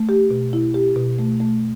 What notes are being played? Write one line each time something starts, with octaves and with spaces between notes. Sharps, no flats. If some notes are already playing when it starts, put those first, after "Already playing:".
Already playing: A3
G4
B2
E4
G4
B2
A3
A3